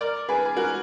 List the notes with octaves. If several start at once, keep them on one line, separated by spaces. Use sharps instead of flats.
A#4 D5
G#4 B4
G#4
F#4 A#4